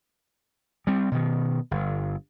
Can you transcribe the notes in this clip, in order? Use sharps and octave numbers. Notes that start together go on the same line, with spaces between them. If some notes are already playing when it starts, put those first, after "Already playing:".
G3 C4
B2 D#3
G1